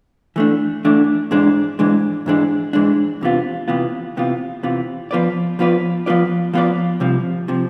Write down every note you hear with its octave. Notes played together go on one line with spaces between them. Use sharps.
E3 A3 D4
E3 A3 D4
G#2 E3 G#3 D4
G#2 E3 G#3 D4
G#2 E3 G#3 D4
G#2 E3 G#3 D4
E2 C3 E3 B3 F4
E2 C3 E3 B3 F4
E2 C3 E3 B3 F4
E2 C3 E3 B3 F4
F3 B3 F4 B4 D5
F3 B3 F4 B4 D5
F3 B3 F4 B4 D5
F3 B3 F4 B4 D5
C2 C3 F3
C3 F3